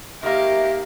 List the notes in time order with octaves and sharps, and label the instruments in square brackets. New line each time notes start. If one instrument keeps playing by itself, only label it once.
[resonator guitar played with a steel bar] D#3 A#3 [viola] G4 [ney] E5